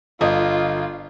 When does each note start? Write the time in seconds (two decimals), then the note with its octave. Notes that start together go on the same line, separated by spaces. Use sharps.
0.21 G1 F4 D#5